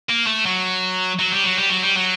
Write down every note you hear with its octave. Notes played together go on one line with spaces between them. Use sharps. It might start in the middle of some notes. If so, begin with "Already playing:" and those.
A#3
A3
F#3
F#3
G3
F#3
G3
F#3
G3
F#3